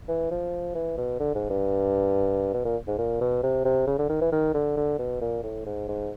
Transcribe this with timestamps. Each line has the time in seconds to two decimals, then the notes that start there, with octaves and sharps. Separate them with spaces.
0.08 E3
0.31 F3
0.75 E3
0.98 B2
1.20 D3
1.35 G#2
1.50 G2
2.54 B2
2.65 A#2
2.87 G#2
2.98 A#2
3.21 B2
3.43 C3
3.65 C3
3.87 C#3
3.98 D3
4.09 D#3
4.21 E3
4.32 D#3
4.54 D3
4.77 D3
4.99 B2
5.21 A#2
5.43 A2
5.66 G#2
5.88 G#2